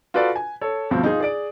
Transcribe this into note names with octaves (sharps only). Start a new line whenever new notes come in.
F4 F#4 A4 B4 D5
G#5
A4 C#5
D2 G2 B2 F3 C4
D#4 F4 G#4
G#4 D5 D7